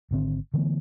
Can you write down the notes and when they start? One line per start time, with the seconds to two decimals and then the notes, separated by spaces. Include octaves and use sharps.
0.11 G#1 D3 C4
0.54 D3 E3 A3 B3